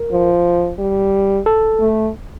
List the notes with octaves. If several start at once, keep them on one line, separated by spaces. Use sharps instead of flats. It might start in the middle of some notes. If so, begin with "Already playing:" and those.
Already playing: A#4
F3
G3
A4
A3